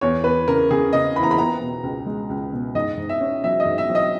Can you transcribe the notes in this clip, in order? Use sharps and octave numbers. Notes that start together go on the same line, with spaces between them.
E2 C#5
E2 B4
C#3 A#4
C#3 G#4
C#3 D#5
E3 B5
A#5
B5
B3 A#5
B2
C#2
G#3
C#2
B2
G#2 D#5
G#2
E5
C#4
F#3 E5
D#5
G#2
E5
F#3
D#5